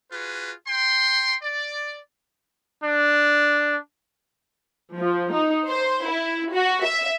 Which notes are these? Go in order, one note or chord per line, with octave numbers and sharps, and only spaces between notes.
F4 F#4 G#4 B4
G5 C6
D5
D4
F3
D#4
C5
E4
F#4
E5